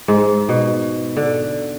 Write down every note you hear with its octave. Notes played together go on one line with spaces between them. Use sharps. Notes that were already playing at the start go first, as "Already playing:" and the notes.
G#2
B2
D3